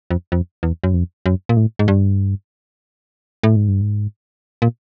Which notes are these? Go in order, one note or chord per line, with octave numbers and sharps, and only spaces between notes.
F2
F2
E2
F#2
F2
F#2
A#2
A2
G#2
G2
A2
G#2
G2
G#2
A#2